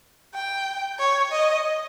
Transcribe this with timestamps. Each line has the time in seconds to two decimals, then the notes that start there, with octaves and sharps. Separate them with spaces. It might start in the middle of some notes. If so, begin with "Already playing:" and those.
0.34 G5
0.98 C#5
1.31 D#5